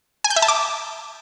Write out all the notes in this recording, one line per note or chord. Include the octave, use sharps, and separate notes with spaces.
G#5
G6
E5
A5
D6